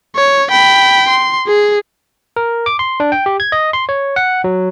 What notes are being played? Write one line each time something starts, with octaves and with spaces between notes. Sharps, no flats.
C#5
G5 B5
C6
G#4
A#4
D6
C6
D4
G5
G4
G#6
D#5
C6
C#5
F#5
F#3